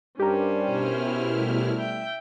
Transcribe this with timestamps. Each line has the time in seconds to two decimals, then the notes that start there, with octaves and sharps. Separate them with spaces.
0.20 G2 G3 C#4 D4 G4 A#4 C5
0.65 B2 E4 F6
1.36 G3 A3
1.76 E5 G5